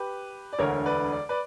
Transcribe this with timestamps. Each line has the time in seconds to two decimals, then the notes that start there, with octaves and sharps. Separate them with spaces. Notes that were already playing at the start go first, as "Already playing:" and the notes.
Already playing: G4 B4
0.52 D5
0.59 E1 D2 D3 A#4 C#5
0.85 B4 D5
1.12 D5
1.29 B4 D5